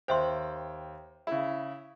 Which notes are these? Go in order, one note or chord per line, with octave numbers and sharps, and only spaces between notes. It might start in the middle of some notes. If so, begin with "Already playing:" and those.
D#2 C5 E5 G5 C6
C#3 E4